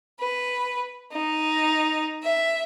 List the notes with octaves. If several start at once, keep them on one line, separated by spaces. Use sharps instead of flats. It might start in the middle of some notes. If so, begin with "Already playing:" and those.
B4
D#4
E5